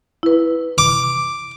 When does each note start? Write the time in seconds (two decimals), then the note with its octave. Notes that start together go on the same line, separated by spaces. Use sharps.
0.23 E4 B4
0.78 D6